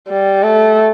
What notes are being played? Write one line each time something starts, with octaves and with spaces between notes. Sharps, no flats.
G3
A3